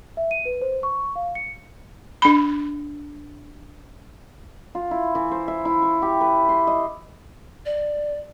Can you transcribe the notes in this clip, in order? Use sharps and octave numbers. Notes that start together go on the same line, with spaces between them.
E5
D#7
B4
C5
C#6
F5
C#7
D4 B5
F4
E4
E3
C5
E5
E4
C#6
G4
B4
C6
D#5
D5